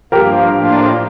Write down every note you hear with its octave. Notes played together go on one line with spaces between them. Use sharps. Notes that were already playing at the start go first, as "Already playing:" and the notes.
G2 F3 A#3 G4 A#4
A2 F3 A#3 D4 F4